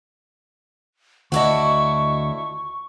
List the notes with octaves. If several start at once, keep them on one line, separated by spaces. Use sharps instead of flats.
D2 D4 E4 F#4 D#5 C#6